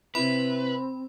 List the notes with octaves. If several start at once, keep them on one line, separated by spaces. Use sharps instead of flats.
C3 C4 E4 B4 B5